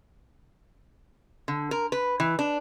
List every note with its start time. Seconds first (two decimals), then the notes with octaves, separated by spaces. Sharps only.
1.48 D3
1.71 A#4
1.92 B4
2.20 E3
2.39 D4